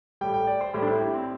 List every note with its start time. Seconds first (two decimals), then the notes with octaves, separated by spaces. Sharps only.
0.21 A2 G3 G5
0.34 G5
0.47 D5
0.61 C5
0.74 A2 G3 C5
0.82 D4
0.88 E4
1.00 G4
1.14 C4